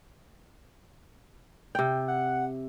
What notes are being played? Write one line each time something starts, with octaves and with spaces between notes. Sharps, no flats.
C3 G5
F#5